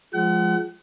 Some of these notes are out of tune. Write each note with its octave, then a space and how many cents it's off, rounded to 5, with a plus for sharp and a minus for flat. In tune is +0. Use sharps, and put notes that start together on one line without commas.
F3 +0 G#3 +0 F#5 +35